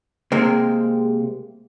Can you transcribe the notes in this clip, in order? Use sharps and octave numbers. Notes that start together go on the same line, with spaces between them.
C3 G#3 A#3 C4